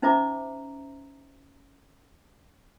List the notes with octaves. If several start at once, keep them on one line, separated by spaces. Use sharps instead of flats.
C#4 D#4 C5 E5 A#5 D6